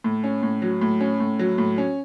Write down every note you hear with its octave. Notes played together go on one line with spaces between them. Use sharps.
A2
C#4
A2
F#3
A2
C#4
A2
F#3
A2
C#4